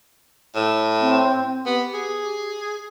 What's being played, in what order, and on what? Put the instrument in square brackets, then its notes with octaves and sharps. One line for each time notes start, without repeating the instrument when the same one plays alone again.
[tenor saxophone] A2
[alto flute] C4
[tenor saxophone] B3 [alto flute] G4
[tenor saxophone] G#4